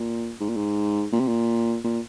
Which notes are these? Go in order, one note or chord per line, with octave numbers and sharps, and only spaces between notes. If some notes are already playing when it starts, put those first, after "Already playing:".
Already playing: A#2
G#2
A#2
G#2
A#2
C3
A#2
A#2